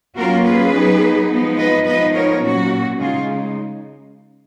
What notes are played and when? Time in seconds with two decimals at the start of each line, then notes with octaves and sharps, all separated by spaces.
0.16 F#3 A#3 C#4 F4 F#4 A#4
0.45 G#4 B4
0.73 F#3 B3 D#4
1.30 F3 G#3 B3 D#4
1.58 B4 D#5
1.86 F3 B3 D#4 B4 D#5
2.14 A#4 C#5
2.42 A#2 F#3 C#4 F#4
2.99 C#3 G#3 D#4 F4 G#4